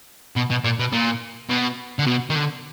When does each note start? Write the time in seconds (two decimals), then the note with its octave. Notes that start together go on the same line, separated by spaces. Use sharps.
0.36 B2
0.50 B2
0.64 A#2
0.79 B2
0.92 A#2
1.49 B2
1.99 D3
2.07 B2
2.30 D#3
2.35 D3